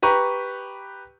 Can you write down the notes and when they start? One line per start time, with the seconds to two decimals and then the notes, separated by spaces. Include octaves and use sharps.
0.02 G4 B4 A#5 C#6